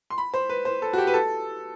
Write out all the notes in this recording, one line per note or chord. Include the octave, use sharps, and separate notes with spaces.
C6
B5
C5
B4
C5
A4
F#4
G4
B4
A4